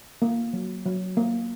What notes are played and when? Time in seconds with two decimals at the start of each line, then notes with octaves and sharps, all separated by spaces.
0.22 A#3
0.53 F#3
0.86 F#3
1.17 A#3